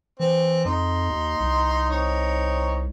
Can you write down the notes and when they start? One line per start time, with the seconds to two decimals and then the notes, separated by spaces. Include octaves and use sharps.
0.20 E3 C4
0.65 F2 D#4 C6
1.10 D#2
1.40 C2
1.90 C4 D#4 C#5